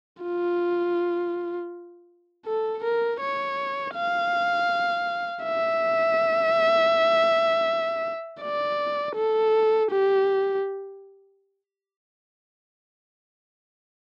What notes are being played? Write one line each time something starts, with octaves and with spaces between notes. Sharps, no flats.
F4
A4
A#4
C#5
F5
E5
D5
A4
G4